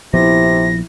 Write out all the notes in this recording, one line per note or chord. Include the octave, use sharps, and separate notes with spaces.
A#1 C3 F3 B3 E4 A#6